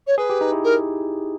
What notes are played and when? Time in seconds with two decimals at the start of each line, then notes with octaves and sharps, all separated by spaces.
0.07 C#5
0.18 G#4 B4
0.30 G4
0.41 D#4
0.52 E4
0.64 A#4